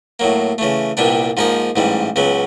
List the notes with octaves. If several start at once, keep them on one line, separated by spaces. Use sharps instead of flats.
A2 F#3 A#3
C#3 E3 A3
C2 A#2 G3 B3 D4
G#2 F3 A#3 D#4 G#4
A1 G#2 E3 G3
C#2 C#3 F#3 B3